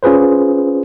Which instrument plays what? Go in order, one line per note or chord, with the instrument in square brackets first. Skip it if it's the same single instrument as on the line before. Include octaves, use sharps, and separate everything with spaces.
[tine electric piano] C#4 F4 G#4 B4 C5